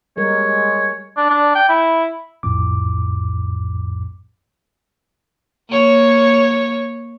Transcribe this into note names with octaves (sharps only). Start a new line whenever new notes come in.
G3 G#3 A#4 C#5
D4
D4
G5
E4
B1 F2 A2 D6
A#3 C#5